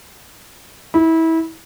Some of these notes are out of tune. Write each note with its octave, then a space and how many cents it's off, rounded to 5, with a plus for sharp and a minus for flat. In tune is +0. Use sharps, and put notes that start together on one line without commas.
E4 -25